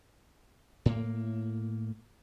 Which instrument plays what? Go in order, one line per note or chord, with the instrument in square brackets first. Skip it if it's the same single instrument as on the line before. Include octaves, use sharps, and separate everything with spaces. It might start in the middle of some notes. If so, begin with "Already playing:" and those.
[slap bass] A2 A#3